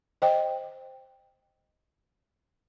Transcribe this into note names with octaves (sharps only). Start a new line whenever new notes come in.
C5 D#5 G5